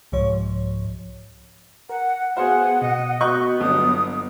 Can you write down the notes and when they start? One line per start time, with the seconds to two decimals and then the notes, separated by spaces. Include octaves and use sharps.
0.12 C2 G#2 F3 C#5
1.89 A#4 F#5
2.37 B3 F#4 G#4 C5 F5 F#5
2.82 B2 D#5
3.21 B3 F#4 D#5 C#6 F#6 G6
3.60 G1 F#3 D#6